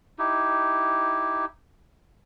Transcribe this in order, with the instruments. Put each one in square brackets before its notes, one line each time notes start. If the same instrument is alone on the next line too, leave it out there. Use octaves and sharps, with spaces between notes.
[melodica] D#4 E4 G4